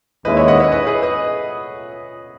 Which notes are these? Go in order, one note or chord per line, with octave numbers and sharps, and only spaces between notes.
D#2 D#3 G#3 C#4 E4 B4 D#5
C#5 E5
D#5 F#5
C#5 E5
B4 D#5
G#4 B4
B4 D#5